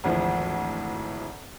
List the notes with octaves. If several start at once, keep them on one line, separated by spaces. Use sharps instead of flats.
G#1 D2 E3 F3